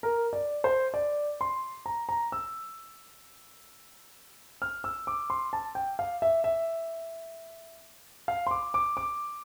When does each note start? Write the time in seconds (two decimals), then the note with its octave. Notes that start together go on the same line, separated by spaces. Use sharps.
0.03 A#4
0.33 D5
0.64 C5
0.94 D5
1.41 C6
1.86 A#5
2.09 A#5
2.32 E6
4.62 F6
4.84 E6
5.07 D6
5.30 C6
5.53 A5
5.75 G5
5.99 F5
6.22 E5
6.44 E5
8.28 F5
8.47 C6
8.51 D6
8.74 D6
8.97 D6